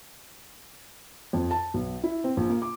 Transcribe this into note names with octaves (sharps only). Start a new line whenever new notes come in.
F2
A5
B1
E4
C4
A#1
A#3
D6